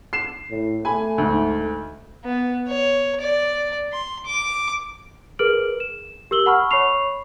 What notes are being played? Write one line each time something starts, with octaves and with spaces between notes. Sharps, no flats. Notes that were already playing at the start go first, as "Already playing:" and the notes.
C7 E7
A2
A3 G#5 B5
D2 G#2
B3
C#5
D5
C6
D6
G#4 A#4 B4 F6 D7 F#7
E7
G4 A#4 E6 F#7 G7
F#5 A5 B5 C#6 E6 F6
C#5 B5 C#6 C7 F7